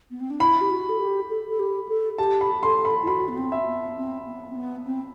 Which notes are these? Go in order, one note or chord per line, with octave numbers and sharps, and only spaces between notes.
B3
C4
D4
E4 B5
G4
F#4
A4
G4
A4
A4
G4
A4
G4 A5
B5
A4 C6
B5
E4
F#4 B5
B3
C4
E5
B3
C4
B3
C4
B3
C4